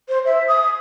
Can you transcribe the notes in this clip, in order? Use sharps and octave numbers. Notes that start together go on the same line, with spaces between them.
C5
E5
D#6